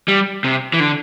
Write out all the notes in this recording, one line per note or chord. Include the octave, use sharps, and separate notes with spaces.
G3
C3
E3
D3